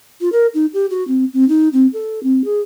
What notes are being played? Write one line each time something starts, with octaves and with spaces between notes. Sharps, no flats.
F4
A#4
D#4
G4
F#4
C4
C4
D#4
C4
A4
C4
G#4